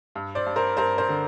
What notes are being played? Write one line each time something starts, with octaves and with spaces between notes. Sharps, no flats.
G2
C5 D5
G2
A#4 C5
G2 A#4 C5
A#4 C5
D3